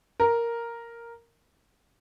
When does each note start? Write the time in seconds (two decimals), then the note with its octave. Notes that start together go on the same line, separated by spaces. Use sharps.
0.20 A#4